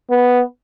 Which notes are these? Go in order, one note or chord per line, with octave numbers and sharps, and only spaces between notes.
B3